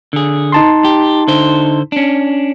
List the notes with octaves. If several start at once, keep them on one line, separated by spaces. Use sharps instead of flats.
D3 G#4
D#4 A5 C6
G4
D3 C5
C#4 D4